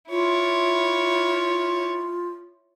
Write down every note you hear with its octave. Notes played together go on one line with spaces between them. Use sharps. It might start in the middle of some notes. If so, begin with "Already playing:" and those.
E4 F4 C#5